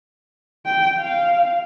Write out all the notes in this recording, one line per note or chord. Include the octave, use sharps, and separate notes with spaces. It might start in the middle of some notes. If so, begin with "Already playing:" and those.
G5
F5